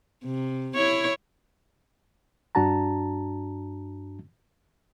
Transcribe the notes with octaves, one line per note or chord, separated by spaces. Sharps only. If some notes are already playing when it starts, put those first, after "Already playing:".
C3
E4 C#5
G2 D4 F#4 A5 A#5